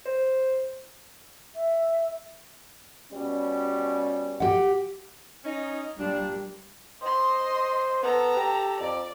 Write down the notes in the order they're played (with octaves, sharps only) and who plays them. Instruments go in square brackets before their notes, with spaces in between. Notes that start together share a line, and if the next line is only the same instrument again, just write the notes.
[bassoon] C5
[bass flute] E5
[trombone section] B2 G3 C#4
[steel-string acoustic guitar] G4 F#5
[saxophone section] C#4 D#4
[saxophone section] A#2 A#3 D4 [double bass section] G3
[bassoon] C5 [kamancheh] D#5 C6
[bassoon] B3 [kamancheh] A4 A#5
[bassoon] G4
[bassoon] F2 [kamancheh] D5